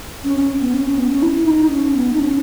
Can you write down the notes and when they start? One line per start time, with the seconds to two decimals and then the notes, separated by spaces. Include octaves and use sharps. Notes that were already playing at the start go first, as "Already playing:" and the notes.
0.24 C#4
0.36 C#4
0.61 B3
0.74 C#4
0.86 C#4
0.97 B3
1.10 C#4
1.22 E4
1.46 D#4
1.70 C#4
1.96 B3
2.13 D#4
2.20 C#4